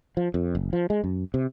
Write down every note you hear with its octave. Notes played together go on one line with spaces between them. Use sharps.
F3
F2
F#1
F3
G#3
F#2
C3